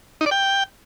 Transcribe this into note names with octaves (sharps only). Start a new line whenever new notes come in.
D#4
D5
G5